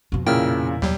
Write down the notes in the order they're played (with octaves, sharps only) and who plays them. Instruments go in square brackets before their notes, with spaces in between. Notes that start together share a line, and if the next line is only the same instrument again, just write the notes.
[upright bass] F2 B2
[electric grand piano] A#2 C#3 [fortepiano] E4 A#4 [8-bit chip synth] G5 F6
[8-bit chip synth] D#2 F#3 [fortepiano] G3